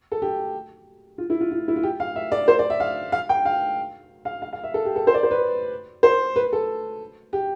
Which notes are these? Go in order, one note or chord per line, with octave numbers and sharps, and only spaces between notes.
A4
G4
F4
E4
F4
F4
E4
F4
G4
F5
E5
D5
C5
D5
E5
F5
F5
G5
F5
F5
F5
F5
E5
A4
G4
A4
C5
D5
C5
B4
C5
B4
A4
G4